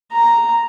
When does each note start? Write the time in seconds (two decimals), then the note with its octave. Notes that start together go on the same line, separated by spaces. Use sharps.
0.13 A#5